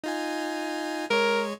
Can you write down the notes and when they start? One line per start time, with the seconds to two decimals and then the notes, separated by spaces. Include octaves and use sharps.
0.04 D#4 F4 G#5
1.10 G#3 A#4 C#5